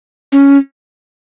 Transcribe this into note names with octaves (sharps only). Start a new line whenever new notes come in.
C#4